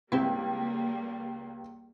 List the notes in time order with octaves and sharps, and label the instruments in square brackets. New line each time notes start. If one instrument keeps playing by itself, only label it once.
[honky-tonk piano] C#2 G4 [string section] G3 A#3 [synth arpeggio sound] C4 E4